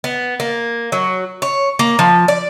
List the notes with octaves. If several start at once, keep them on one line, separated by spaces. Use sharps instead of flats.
B3
A#3
F#3
C#5
A#3
F3
D5